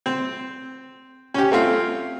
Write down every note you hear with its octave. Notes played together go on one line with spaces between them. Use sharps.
C4
C#4 G4
A3 C4 F4